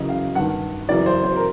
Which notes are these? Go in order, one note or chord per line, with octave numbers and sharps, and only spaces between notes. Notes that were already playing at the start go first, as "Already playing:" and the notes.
Already playing: F#2 C#3 E3 D#5
F5
G2 D#3 F#5
F#2 C#3 E3 D5
C5
C5
A#4